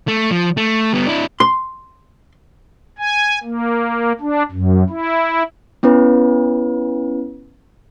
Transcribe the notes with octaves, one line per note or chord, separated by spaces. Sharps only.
A3
F3
A3
G3 B3
D4 E4
C6
G#5
A#3
D4
F#2
E4
B3 C#4 E4 B4